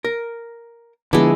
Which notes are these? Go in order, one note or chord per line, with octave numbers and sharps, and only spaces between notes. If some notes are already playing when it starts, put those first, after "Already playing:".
A#4
D3 F3 G#3 B3 D4 E4